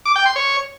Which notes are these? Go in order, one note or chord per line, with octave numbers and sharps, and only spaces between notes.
D6
G5
C6
C#5